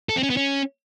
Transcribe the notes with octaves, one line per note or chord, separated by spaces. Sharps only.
A4
C4
C#4
B3
C#4